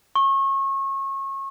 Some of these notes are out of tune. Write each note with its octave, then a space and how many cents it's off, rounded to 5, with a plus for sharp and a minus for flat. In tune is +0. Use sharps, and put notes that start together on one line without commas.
C#6 -30